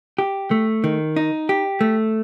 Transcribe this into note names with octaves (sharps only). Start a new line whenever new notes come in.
G4
A3
D#3
D#4
G4
A3